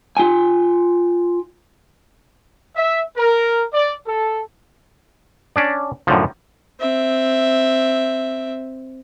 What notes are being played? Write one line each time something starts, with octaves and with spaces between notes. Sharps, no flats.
F4 G5 G#5
E5
A#4
D5
A4
C#4 D4 D5
F#2 A2 D3 F3
C4 E5